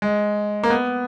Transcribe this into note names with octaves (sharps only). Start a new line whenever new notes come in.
G#3
A#3
B3